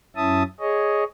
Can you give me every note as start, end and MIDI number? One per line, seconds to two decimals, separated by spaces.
0.16 0.43 42
0.16 0.43 61
0.16 0.43 64
0.16 0.43 76
0.16 0.43 81
0.16 0.43 87
0.60 1.04 68
0.60 1.04 73
0.60 1.04 75